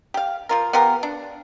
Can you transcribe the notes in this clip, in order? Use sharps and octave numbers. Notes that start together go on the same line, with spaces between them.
G4 F5
F3 F4 A#4
B3 F4 G4 A#4
D4